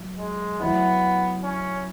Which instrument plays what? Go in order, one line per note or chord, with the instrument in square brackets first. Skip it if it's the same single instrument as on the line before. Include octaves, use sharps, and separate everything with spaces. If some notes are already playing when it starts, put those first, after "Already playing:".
Already playing: [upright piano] F#3
[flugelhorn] G#3
[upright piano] F#3 E4 [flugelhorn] B3
[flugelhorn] C#4